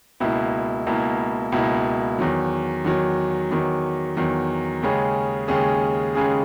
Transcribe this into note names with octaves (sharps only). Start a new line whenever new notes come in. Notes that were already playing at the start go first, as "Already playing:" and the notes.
C#2 B2 A#3 E4
C#2 B2 A#3 E4
C#2 B2 A#3 E4
E2 D#3 F#3
E2 D#3 F#3
E2 D#3 F#3
E2 D#3 F#3
D#2 C#3 G#3 C#4 G#4
D#2 C#3 G#3 C#4 G#4
D#2 C#3 G#3 C#4 G#4